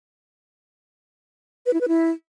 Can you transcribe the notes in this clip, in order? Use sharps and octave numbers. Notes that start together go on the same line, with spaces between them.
B4
E4
B4
E4